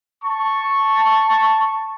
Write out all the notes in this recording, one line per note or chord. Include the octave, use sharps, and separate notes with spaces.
A5 C#6